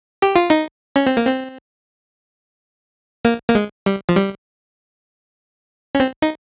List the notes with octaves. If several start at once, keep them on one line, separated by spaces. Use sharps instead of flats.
G4
F4
D#4
C#4
C4
A#3
C4
A#3
A#3
G#3
G3
F3
G3
C#4
C4
D#4